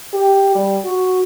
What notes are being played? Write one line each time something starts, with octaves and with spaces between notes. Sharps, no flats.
G4
G3
F#4